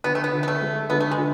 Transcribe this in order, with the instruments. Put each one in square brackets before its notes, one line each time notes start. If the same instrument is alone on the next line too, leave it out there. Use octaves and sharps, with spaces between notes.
[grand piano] D3 [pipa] B3
[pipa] A3
B3
[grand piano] D3
[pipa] B3
A3
[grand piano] G#3
[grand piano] D3 [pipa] B3
[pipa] A3
G#3
[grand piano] D3